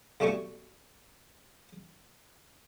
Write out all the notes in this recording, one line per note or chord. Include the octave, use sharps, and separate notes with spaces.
B1 G3 A3 C#5 G#5 C#6